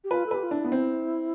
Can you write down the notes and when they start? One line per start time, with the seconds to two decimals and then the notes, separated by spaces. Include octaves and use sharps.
0.04 G4
0.11 F4 B4
0.26 A4
0.31 G4 B4
0.43 F4
0.51 D4 E4
0.64 B3
0.72 C4